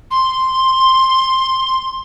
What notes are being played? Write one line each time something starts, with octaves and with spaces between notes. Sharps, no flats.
C6